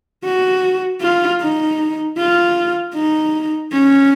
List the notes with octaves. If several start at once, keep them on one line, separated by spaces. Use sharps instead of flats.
F#4
F4
D#4
F4
D#4
C#4